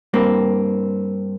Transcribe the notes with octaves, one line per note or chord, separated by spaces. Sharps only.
G2 A#3 C4